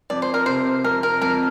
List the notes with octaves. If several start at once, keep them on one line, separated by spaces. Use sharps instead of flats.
F2 D5
C5
A#4
C3 C5
F2 A#4
A#4
F2 A#4